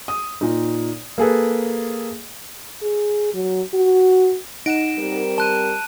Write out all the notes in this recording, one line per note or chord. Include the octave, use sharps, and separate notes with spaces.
D#6
A#2 D#4
A#3 G#4 A4 B4
G#4
F#3
F#4
D#4 F#5 D7 E7
G3 C4 A#4
C5 A5 F#6 D#7